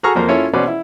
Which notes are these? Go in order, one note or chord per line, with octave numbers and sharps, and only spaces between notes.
F#4 G#4 A4 A#5 C#6 F6
F2 A#3 C5 A#5
C#4 E4 F4 A4 C#5
B2 C#4 B4 C5 D5
E4